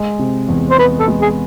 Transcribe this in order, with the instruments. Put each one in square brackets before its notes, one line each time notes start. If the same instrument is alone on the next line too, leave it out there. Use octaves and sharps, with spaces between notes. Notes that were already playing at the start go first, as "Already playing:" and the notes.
Already playing: [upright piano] G#3
C3
E2
[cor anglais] C5
[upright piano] B3 [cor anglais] B4
[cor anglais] A4
[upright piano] G#3
[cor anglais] G#4